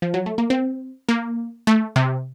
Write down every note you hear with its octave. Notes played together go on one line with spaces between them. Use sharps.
F3
F#3
A3
A#3
C4
A#3
A3
C3